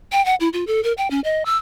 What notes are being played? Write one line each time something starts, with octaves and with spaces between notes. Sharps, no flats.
G5
F#5
E4
F4
A4
A#4
G5
C#4
D#5
E6